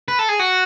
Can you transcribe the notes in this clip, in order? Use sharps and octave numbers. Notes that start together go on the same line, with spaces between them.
B4
A4
G#4
F#4